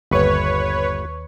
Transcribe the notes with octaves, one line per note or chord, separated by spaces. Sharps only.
G1 D#2 B4 C#5 C#6